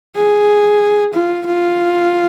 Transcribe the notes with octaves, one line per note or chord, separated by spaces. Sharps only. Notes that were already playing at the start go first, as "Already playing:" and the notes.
G#4
F4
F4